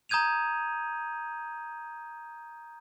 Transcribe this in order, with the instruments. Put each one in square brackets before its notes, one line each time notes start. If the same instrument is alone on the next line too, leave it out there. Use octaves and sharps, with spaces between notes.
[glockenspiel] A#5 D#6 G6 G#6 D#7 F7